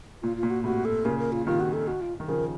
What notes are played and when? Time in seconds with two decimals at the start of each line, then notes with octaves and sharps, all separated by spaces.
0.22 A#2 F4
0.37 F4
0.43 A#2
0.50 F#4
0.64 A2 C3 F#4
0.85 A4
1.05 A#2 C#3 A#4
1.19 A#4
1.32 F4
1.46 C3 D#3 F4
1.60 F#4
1.73 A4
1.87 F#4
2.01 F4
2.20 D#3
2.28 C#3 F3 A#4